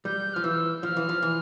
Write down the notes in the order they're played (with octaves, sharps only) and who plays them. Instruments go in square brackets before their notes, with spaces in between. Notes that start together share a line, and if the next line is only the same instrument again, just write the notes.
[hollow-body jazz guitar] G3 [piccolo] G6
[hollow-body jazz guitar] F3 [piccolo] F6
[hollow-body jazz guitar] E3 [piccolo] E6
[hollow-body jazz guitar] F3 [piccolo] F6
[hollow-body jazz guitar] E3
F3
E3